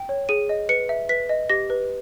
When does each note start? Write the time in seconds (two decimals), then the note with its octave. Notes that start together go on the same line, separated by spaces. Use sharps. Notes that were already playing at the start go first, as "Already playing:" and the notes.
Already playing: G5
0.09 C#5
0.29 G#4 D#7
0.49 D#5
0.69 B4 C#7
0.89 E5
1.09 B4 B6
1.29 D#5
1.50 G4 A#6
1.70 B4